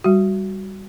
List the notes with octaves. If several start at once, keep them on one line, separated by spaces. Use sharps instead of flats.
G3 F#4